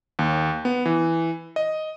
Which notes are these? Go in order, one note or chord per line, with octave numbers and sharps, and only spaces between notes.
D#2
B3
E3
D#5